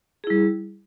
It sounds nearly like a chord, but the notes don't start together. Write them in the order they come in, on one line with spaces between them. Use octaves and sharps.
G#4 E4 G3